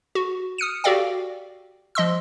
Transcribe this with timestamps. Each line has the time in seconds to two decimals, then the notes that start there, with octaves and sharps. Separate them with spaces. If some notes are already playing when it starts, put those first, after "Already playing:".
0.15 F#4
0.58 D#6 F6 C#7 D#7
0.84 F#4 G4 A4 D5 F5 G5
1.95 F3 D#5 C6 E6